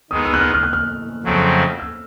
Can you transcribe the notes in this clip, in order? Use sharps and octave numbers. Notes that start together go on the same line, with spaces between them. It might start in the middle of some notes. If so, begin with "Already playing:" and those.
D#3 G#3 B3 D#4 D#6
E6
F#6
F6
F6
F#6
F6
F2 C#3 F#3 A3 C4
E6